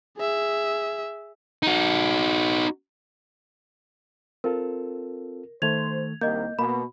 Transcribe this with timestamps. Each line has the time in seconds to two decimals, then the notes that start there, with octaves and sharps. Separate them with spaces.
0.18 G#4 E5
1.63 D#4 F#4
4.44 C4 F4 A4 A#4
5.62 D#3 A3 C5 G#6 F7
6.21 C2 D#3 A#3 D#5 G6
6.59 B2 A#3 B5